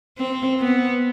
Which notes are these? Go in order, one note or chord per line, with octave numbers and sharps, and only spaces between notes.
C4
B3